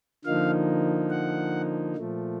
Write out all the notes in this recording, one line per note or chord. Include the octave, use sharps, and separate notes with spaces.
D3 F3 A#3 D#4 F5
F#5
A#2 F3 A3